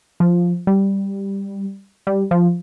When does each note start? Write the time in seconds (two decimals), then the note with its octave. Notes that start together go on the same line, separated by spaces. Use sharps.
0.20 F3
0.67 G3
2.07 G3
2.31 F3